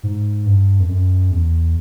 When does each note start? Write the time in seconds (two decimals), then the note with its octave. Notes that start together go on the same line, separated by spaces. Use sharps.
0.03 G#2
0.46 G2
0.80 F2
0.89 F#2
1.31 E2